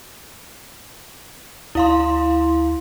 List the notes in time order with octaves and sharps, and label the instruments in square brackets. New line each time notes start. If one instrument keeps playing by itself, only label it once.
[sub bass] D2 [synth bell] E4 F5 C6